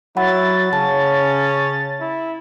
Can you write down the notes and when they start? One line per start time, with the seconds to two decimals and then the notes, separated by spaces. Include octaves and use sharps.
0.17 F#3 E4 F#5 B5 A6
0.73 C#3 C#4 A5
2.00 E4